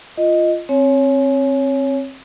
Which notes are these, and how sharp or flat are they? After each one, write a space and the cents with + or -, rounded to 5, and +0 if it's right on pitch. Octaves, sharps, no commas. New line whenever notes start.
F4 -10 D#5 +0
C4 +20 C#5 +5 G#5 +25